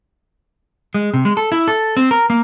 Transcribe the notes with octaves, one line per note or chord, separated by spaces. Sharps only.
G#3
C3
G#3
A4
E4
A4
C4
A#4
A#3